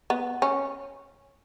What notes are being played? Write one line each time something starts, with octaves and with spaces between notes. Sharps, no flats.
B3
C#4